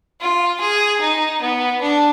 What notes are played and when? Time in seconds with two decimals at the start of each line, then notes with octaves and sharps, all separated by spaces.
0.21 F4
0.61 G#4
1.01 D#4
1.42 B3
1.82 D4